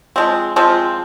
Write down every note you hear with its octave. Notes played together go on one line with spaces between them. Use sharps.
F3 G#3 C4
F3 G#3 C4